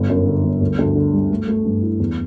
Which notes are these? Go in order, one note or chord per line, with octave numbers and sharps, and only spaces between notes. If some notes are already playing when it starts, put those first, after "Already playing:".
Already playing: G1
F#2
D3
G1
D2
D2
D3
G3
A3
A3
G2
E4
E2